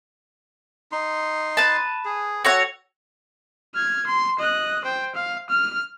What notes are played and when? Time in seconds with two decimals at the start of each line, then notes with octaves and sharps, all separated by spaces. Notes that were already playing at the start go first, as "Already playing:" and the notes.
0.92 D#4 C6
1.57 B4 A5
2.05 G#4
2.45 F#4 A4 C#5 F#5
3.74 F6 G#6
4.06 C6
4.39 D#5 F#6
4.84 C5 G5
5.15 F5
5.50 F6